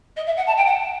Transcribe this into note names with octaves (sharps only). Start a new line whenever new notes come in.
D#5
E5
F#5
A5
G5
F#5